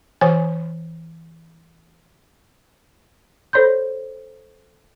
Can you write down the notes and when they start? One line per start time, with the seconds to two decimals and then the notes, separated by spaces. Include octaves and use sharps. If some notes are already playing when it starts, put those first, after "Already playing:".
0.21 E3 C#5 G#5
3.53 A4 C5 C#5 B5 C6 G6